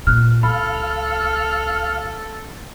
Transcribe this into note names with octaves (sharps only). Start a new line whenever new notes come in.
A#2 F6 F#6
C#2 A4 F5 B5